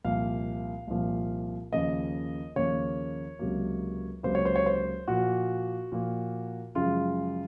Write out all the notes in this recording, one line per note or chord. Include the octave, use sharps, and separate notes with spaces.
C2 A#2 F3 A#3 F5
C2 A#2 F3 A#3
D#2 C#3 F3 A#3 D#5
D#2 C#3 F3 A#3 C#5
C#2 C3 F#3 A#3
C#2 C3 F#3 A#3 C5
C#5
C5
C#5
C5
A#2 F3 A#3 F#4
A#2 F3 A#3
F#2 C#3 F3 G#3 F4